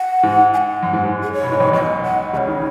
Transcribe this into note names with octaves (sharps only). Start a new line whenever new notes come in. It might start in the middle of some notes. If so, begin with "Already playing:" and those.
Already playing: F#5
G#2
G#5
F#5
F#2
G#2
G#2
G#4
C#5
B2
G#2
B1 B2
B1 B2 D#5
F#5
C#2 C#3 C#5 D#5
D#3